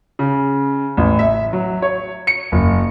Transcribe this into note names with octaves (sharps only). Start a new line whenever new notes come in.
C#3
A1
E5
F#3
C#5
C#7
F#1